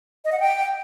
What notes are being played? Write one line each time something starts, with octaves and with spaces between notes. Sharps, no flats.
D#5
F#5
G5